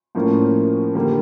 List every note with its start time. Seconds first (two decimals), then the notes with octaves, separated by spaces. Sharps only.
0.15 A2 F3 A#3 C#4
0.95 D3 G3 A#3